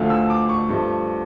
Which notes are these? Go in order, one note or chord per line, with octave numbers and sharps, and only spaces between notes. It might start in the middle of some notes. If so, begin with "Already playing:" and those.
Already playing: D2 D3 F3 A3 F5
E6
D6
C#6
G2 F3 A3